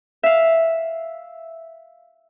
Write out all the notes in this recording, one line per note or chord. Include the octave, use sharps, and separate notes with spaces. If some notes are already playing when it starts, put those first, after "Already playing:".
E5 F5